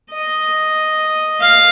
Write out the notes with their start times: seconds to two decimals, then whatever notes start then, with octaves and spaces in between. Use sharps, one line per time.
0.12 D#5
1.40 F5